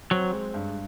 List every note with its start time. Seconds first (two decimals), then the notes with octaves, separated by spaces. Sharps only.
0.11 F#3 C4
0.32 G#3
0.54 G2